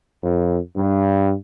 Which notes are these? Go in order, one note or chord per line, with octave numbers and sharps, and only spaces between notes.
F2
G2